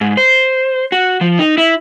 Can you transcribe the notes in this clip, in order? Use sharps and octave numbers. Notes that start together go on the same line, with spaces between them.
G#2
C5
F#4
F3
D#4
E4